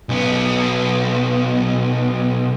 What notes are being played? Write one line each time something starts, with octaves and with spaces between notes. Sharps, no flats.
B1 B3